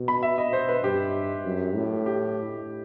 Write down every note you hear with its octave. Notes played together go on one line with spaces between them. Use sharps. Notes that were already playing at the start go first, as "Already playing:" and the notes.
Already playing: B2
B5
E5
D#5
C5
B4
G2 G4
F#2
A2
G4